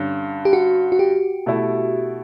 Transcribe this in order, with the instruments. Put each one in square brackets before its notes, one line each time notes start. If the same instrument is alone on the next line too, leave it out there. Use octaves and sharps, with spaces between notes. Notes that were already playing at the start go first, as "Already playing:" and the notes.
Already playing: [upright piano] G2 D3 C#4
[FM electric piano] G4
F#4
F#4
G4
[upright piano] B2 A3 E4